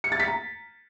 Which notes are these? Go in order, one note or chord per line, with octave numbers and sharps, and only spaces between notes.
C#7
A6
B6
A#5